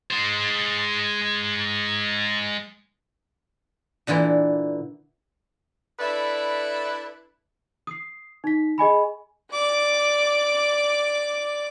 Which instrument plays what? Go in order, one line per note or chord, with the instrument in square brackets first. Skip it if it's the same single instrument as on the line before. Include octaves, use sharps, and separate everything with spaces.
[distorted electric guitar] G#3 C5
[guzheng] A#2 D3 E3 E4
[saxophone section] D4 E4 A4 B4 D5 E5
[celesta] D#6 C7
D#4 B6
G#4 D#5 G#5 B5
[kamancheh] D5 D6